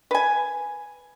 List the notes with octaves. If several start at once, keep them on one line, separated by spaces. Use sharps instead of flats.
B4 G#5